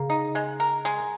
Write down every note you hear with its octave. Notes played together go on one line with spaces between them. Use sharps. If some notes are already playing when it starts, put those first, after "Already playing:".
Already playing: C#3 A#3
D#4
G#3
A#4
G#3